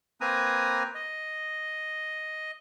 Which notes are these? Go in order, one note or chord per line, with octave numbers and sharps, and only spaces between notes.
A#3 C4 B4 G#5 A#5 D#6
D#5